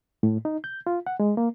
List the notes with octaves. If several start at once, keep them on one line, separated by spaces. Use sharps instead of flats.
A2
D#4
G6
F4
F#5
G#3
A#3